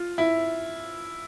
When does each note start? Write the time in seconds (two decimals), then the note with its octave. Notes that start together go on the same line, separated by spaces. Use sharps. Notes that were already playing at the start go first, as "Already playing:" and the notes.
Already playing: F4
0.18 E4